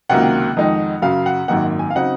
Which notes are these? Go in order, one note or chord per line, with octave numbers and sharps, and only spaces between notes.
C#2 C3 D#3 F#3 A#3 F#5
F2 D#3 G#3 D#4
F#2 C#3 F#3 F5
F#5
G#1 F#2 D#3 A#3 F#5
G#5
F5
C#3 F#3 C4 D#4 F#5